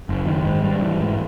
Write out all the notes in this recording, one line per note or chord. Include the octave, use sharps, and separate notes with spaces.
F#1
D#3
G#2
G3
E3
G#2